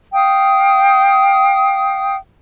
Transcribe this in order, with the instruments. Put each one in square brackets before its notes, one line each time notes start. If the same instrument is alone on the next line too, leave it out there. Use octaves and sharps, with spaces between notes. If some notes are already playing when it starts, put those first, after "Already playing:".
[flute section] F5 G5 D#6